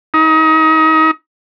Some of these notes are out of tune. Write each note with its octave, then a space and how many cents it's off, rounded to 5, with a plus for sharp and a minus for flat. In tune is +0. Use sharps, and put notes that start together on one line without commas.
D#4 +30